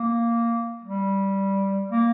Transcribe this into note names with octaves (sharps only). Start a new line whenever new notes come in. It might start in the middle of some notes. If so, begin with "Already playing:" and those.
Already playing: A#3
G3
A#3